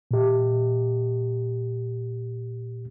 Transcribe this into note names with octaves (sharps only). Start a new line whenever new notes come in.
A#2 G4